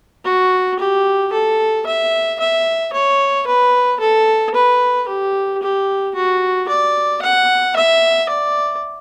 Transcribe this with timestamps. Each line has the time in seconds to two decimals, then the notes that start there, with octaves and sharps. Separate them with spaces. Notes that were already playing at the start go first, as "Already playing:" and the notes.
0.24 F#4
0.79 G4
1.33 A4
1.86 E5
2.39 E5
2.93 C#5
3.46 B4
4.00 A4
4.54 B4
5.08 G4
5.62 G4
6.14 F#4
6.68 D5
7.22 F#5
7.76 E5
8.29 D5